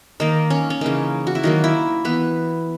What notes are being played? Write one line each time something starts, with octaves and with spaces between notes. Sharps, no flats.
D#3 A#3 D#4
C#4
C#4
C#3 E3 A#3 D#4
F#4
E4
D#3 F#3 A#3 D#4
E4
E3 B3 B4